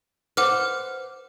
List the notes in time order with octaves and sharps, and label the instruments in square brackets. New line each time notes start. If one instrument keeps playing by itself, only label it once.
[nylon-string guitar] B4 C5 [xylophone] F#5 D6 F6